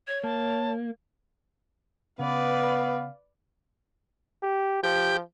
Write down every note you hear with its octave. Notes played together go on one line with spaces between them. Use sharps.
C#5 G#6
A#3 A5
C#3 B3 B4 D5 F5
G4
F3 G4